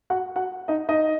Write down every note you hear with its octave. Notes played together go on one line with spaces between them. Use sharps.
F#4 F#5
F#4 F#5
D#4 D#5
D#4 D#5